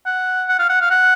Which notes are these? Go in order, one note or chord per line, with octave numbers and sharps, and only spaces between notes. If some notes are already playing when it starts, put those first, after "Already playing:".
F#5
F#5
F5
F#5
F5
F#5